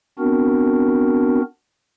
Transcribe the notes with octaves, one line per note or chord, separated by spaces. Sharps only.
B3 C4 D4 F#4 A#4